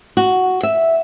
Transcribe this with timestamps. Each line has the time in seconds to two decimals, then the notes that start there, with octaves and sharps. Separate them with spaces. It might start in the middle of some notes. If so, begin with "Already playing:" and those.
0.17 F#4
0.63 E5